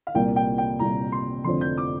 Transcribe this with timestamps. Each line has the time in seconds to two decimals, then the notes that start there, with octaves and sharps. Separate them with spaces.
0.07 F5
0.14 C2 A#2 A#3 G5
0.36 G5
0.58 G5
0.79 C2 A#2 A#3 A#5
1.12 C6
1.44 F1 F2 D3 F3 C4 C6
1.61 G6
1.78 D6